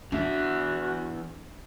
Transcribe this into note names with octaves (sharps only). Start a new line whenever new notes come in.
E2 D4 F#4 E5